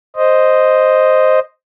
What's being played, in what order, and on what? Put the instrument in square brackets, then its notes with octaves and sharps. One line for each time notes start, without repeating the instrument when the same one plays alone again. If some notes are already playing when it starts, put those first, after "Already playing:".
[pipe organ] C5 D#5